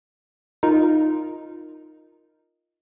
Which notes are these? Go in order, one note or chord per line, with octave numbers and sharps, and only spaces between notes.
D#4 F4 A#4